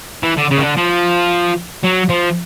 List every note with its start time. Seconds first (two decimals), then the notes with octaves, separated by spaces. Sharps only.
0.23 E3
0.37 D3
0.50 C#3
0.58 D#3
0.63 D3
0.77 F3
1.84 F#3
2.10 F3